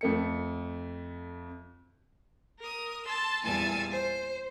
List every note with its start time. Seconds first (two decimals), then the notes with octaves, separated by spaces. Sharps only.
0.01 F2 A3 C#7
2.59 A#4 D#6
3.05 A5 C6 E6
3.43 E2 A#2 G3 G#5 A5 E6
3.91 C5